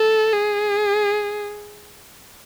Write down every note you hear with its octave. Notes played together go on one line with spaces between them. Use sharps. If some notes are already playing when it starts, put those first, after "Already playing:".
Already playing: A4
G#4